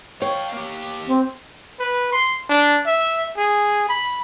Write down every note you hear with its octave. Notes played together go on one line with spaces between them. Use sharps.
C#5 F5 G5
A#3 G4
C4
B4
C6
D4
E5
G#4
B5